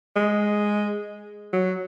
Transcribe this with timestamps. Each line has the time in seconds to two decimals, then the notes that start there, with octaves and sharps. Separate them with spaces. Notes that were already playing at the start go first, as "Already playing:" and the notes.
0.16 G#3
1.53 F#3